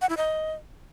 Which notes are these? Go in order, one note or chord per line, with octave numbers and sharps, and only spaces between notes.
F#5
E4
D#5